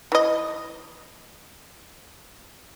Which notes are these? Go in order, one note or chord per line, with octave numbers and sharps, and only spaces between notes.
E3 D#5